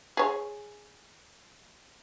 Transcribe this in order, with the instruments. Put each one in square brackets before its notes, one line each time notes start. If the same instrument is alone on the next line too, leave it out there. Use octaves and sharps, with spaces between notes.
[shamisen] G#4 C#5